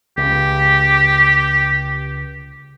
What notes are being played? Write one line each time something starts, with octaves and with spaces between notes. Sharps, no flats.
C#2 G4